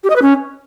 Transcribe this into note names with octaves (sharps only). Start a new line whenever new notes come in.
G4
D#5
B4
C#4